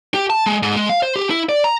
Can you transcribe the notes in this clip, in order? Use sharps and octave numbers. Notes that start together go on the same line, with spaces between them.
G4
A5
G#3
G#2
G#3
F5
C5
G4
E4
D5
A#5